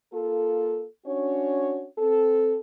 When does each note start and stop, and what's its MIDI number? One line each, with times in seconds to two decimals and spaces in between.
0.14 0.86 58
0.14 0.86 65
0.14 0.86 69
1.06 1.87 61
1.06 1.87 62
1.06 1.87 66
1.06 1.87 73
1.98 2.58 60
1.98 2.58 69